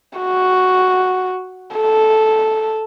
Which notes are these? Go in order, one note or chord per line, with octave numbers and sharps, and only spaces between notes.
F#4
A4